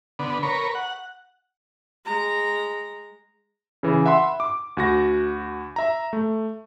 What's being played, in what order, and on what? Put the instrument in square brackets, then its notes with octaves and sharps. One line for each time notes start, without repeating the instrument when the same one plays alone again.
[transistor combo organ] D3 B3
A#4 B4 C#5
F#5
[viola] G#3 A#5
[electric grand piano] C#3 E3
E5 F#5 B5 C6
D6
D2 F#4 A#6
E5 A#5
A3